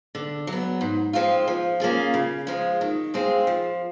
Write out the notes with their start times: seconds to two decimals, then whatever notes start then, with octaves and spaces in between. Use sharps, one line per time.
0.15 D3
0.47 F#3
0.52 B3
0.81 G#2
1.13 F3 G#3 C4 F4
1.48 F3
1.80 A#3 C#4 F4 G#4
2.14 C#3
2.47 F3 G#3
2.81 D#3
3.14 G#3 C4 F4 G#4
3.47 F3